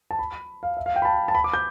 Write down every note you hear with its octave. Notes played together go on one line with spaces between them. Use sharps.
A5
B5
F5
E5
F5
G5
B5
A5
A5
B5
D6
G6